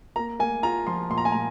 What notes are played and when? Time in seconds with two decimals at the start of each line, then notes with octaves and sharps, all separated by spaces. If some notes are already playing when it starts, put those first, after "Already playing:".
0.16 A#3 A#5
0.39 A#3 G#5
0.63 F4 A#5
0.87 F3 C6
1.10 A#2 C6
1.18 A#5
1.25 G#5
1.32 A#2 A#5